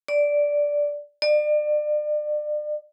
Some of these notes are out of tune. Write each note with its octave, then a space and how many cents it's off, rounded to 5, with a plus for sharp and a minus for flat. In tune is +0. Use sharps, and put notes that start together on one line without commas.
D5 -5
D5 +35